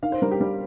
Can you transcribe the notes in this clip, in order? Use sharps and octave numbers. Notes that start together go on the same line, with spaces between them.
D#3 F5
C5
G3 A#4
G4
G3 A#4